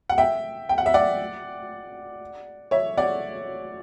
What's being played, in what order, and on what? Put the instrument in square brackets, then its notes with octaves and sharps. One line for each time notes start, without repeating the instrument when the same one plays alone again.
[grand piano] F#5
E5 G5
G5
F#5
E5
D5 F#5
C#5 E5
D5 F#5